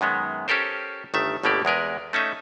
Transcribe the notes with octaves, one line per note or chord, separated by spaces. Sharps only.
F#2 D#3 G#3 B3
C#4 G4 A4 A#4 C5
G1 D#3 A3 E5
G1 B2 A3 A#3 G4 D5
E2 G#3 A#4 B4
A3 C#4 D#4 E5